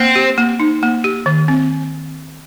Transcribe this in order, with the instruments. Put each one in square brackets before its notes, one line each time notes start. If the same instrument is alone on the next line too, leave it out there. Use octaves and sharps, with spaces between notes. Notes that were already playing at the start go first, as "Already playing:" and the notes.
Already playing: [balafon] A#3 [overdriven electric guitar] C4
[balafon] G4
A#3
D#4
A#3
G4
D#3
C4